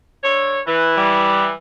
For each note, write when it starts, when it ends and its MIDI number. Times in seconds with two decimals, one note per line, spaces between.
0.24 0.59 50
0.24 0.59 69
0.24 0.59 73
0.67 1.52 52
0.67 0.96 71
0.97 1.49 55